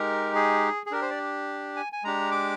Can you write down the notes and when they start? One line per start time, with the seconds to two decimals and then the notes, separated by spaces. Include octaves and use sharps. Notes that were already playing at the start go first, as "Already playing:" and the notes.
Already playing: G#3 D#4 G4 A#4
0.35 G#4
0.86 G#4
0.91 D4 G4 A#4
1.02 C5
1.10 D5
1.76 G#5
1.92 G#5
2.03 G#3 D4 G4 A#5
2.31 D6